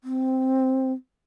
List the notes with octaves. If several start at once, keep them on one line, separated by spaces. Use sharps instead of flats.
C4